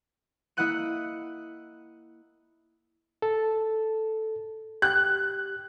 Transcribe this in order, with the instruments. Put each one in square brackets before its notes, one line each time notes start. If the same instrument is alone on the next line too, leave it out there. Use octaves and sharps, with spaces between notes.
[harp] A#3 E4 D#5 F#5 F#6 D#7
[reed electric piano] A4
[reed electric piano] G4 [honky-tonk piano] F#6